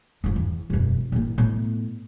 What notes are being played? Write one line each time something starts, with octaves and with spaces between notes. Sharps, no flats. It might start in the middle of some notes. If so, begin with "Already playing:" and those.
G2 F3
E2
E1 F#2
A2 A#3
A2 B3